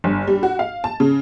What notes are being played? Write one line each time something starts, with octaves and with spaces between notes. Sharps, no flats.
G1
G3
F#4
F5
A5
C#3